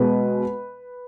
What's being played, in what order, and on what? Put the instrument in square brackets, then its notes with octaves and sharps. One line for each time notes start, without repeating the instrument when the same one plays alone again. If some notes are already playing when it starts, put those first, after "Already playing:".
Already playing: [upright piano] B2 G#3 B4